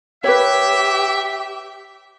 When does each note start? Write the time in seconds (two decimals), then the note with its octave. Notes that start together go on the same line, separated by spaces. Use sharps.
0.24 G4 B4 C#5 E5